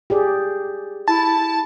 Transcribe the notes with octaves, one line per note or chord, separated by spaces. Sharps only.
G4 G#4 D5
E4 A5